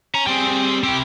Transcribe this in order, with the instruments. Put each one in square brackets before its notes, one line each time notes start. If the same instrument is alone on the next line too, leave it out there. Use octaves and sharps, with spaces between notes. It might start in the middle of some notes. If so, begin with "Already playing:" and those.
[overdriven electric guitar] C#4 [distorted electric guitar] A#5
[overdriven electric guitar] G3 G#4 [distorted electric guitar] C4 G5
[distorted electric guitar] C4 E4 [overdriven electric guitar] G4